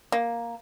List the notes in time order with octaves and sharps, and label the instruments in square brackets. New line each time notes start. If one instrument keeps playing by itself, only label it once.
[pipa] A#3